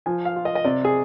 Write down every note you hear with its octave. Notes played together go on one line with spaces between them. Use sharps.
F3 G#5
F5
F4
D#5
D#5
C3 D5
G#4